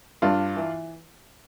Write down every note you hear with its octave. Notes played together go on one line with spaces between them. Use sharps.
G2 D4 F4
E3